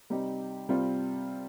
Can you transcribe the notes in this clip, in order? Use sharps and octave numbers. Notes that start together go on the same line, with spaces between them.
C3 G3 C4 D#4 G4
C3 G3 C4 F4